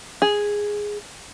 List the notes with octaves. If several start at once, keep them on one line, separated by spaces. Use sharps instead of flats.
G#4